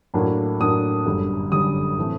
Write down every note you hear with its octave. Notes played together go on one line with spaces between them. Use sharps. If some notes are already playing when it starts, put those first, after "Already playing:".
A2 F#3 A#3 D4
A2 F#3 A#3 D4 D#6
G1 F#2 D3 G3
G1 F#2 D3 G3 D#6
A2 E3 A3 C4